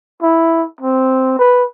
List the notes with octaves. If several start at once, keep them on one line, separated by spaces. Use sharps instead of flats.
E4
C4
B4